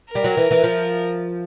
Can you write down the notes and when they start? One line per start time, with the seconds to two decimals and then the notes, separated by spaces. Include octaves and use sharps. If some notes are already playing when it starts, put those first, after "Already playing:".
0.11 G3 A#4
0.24 F#3
0.37 E3
0.51 E3
0.64 F3